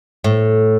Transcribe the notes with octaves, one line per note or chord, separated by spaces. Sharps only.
A2